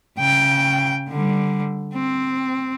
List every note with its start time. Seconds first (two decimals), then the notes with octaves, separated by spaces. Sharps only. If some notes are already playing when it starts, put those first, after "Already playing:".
0.19 C#3 G5
1.09 D3 G3
1.94 C4